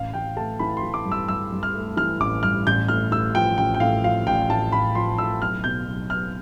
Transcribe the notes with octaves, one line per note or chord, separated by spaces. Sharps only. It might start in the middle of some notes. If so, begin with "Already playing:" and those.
Already playing: A1 F5
A1 G5
A3 A5
E3 B5
C6
E3
D6
G2
E6
G2 E6
G2
F6
A3
E3 F6
A1 D6
G2 F6
A1 G6
A2 F6
A2 E6
F3 G5
A1 G5
G5
A2 F5
F3 F5
A1 G5
A2 A5
A1 B5
F3 C6
A2 E6
B1 F6
B2 G6
B1
B1 F6